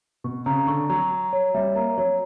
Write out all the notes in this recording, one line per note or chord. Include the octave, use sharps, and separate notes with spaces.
B2 C#6
C#3 A#5
D3 C#6
F#3 A#5
A#5
C#5
G3 E5
A#3 A#5
F#3 C#5